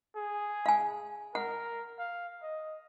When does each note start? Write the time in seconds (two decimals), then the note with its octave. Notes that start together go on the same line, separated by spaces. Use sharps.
0.16 G#4
0.66 F5 G#5
1.35 A#4 F#5
1.99 F5
2.43 D#5